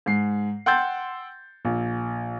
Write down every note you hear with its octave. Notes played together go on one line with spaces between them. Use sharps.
G#2 C7
F#5 G5 C6 E6 G6 A6
A#1